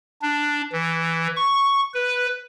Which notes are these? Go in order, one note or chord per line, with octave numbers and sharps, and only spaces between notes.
D4
E3
C#6
B4